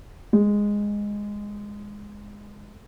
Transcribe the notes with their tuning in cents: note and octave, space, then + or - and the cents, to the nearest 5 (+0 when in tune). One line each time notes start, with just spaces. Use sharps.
G#3 -10